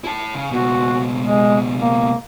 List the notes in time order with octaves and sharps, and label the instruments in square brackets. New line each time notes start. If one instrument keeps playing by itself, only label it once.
[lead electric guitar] E4 A5
C#3
[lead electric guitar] C#2 B2 [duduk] F#4
[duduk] G#3
A#3